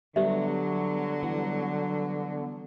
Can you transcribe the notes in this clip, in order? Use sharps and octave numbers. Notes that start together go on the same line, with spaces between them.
D3 F#3 G3 B3 G4 E5
E3 G3 B3